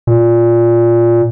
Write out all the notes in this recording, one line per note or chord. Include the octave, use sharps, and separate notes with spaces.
A#2